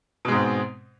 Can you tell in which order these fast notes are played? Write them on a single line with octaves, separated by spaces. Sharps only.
B2 G#3 G#2 C4